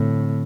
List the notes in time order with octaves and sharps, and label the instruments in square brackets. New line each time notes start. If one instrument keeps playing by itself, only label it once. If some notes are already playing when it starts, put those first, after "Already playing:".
Already playing: [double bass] A2 [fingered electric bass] D3 C4